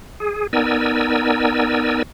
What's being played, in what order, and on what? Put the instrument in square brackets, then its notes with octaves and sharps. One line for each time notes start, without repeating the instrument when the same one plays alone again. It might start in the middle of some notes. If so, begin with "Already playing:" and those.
[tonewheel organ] G#4
B3 D#4 A#4 D5 G#5 E6